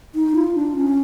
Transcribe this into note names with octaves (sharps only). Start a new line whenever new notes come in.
D#4
F4
D4
C#4